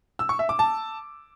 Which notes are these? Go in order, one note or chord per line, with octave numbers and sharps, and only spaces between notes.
E6
C#6
E5
D6
A5